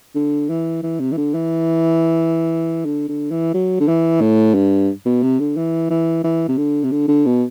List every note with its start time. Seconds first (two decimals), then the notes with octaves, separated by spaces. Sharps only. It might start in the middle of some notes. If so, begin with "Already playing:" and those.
0.15 D3
0.49 E3
0.83 E3
1.00 C3
1.12 E3
1.17 D3
1.34 E3
2.86 D3
3.09 D3
3.31 E3
3.54 F#3
3.80 D3
3.88 E3
4.21 A2
4.54 G2
5.06 B2
5.23 C3
5.39 D3
5.57 E3
5.90 E3
6.24 E3
6.49 C3
6.58 D3
6.84 C3
6.92 D3
7.08 D3
7.26 B2